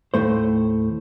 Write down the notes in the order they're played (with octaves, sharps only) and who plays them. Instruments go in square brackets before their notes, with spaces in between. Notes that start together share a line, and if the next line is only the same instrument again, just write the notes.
[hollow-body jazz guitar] D#2 A2 A3 C5